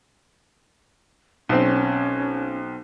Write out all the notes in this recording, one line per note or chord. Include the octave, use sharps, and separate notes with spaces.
B1 C4 C#4